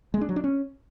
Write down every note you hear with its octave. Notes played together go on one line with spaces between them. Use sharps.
G#3
D4
F#3
D4
C#4